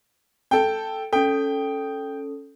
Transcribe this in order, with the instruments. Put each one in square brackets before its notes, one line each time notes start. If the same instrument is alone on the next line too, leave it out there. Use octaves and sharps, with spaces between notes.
[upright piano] A4 G5
[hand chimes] C#4 A4 [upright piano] G5